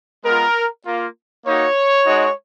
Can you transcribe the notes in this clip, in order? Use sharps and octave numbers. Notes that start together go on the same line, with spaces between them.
G#3 B3 F4 A#4
A#3 F4
A#3 D#4 F#4 C#5
G#3 D#4 F#4